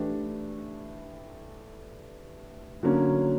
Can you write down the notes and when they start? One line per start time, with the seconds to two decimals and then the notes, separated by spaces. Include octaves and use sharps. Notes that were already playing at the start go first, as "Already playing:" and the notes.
Already playing: E3 A3 D4 G4
2.83 D3 F#3 A#3 C#4